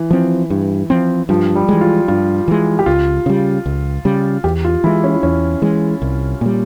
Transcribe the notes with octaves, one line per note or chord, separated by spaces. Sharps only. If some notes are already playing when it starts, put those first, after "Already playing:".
Already playing: E3
F3 C4
G2
F3 C4
G2 F3
G3
E3 G#3
F4
G2 F4
E3 G#3
G4
C#2 F4
C#3 G3
C#2
C#3 G3
E2 G4
F4
E3 G#3 E4
C#4
E4
E2 C#4
E3 G#3
C2
A#2 G3